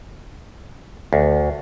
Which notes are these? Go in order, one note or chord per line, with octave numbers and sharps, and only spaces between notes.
D2